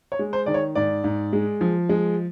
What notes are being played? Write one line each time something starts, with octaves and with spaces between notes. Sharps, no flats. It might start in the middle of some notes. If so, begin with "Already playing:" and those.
C#5
G#3
C5
D#3 D5
C#5
G#2 D5
G#2
G#3
F3
G#3